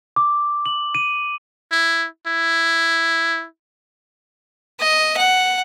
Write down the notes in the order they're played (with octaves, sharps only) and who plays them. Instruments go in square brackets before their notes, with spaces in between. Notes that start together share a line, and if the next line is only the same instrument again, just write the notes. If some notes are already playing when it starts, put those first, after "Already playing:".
[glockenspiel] D6
F#7
D#7
[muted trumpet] E4
E4
[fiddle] D#5
F#5